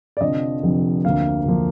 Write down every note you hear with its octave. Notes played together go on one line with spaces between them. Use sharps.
D5
F1 F2 D3 F3 D#5
F1 F2 D3 F3
D2 D3 F3 A#3 F5
D2 D3 F3 A#3